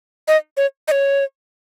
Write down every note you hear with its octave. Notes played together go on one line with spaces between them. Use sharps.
D#5
C#5
D#5
C#5